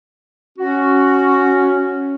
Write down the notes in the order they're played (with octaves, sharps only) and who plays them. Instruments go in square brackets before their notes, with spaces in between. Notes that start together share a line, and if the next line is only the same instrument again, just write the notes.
[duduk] C#4 [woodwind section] F#4